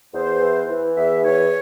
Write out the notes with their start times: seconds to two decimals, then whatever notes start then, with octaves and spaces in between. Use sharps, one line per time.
0.13 E2 C5
0.40 E3
0.68 E3
0.96 E2 E5
1.24 E3 C#5